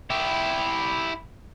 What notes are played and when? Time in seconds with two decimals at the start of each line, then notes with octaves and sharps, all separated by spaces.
0.10 E4 G4